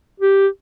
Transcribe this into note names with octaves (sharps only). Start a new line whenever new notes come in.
G4